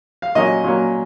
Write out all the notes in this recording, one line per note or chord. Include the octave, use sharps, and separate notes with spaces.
F5
A#2 F#3 A#3 C#4 D#5
A#2 F#3 A#3 C#4